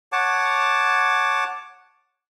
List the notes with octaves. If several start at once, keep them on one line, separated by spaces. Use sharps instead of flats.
C#5 F#5 A5 D6